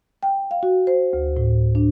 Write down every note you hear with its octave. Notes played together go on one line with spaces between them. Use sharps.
G5
F5
F#4
C5
D2
A2
D4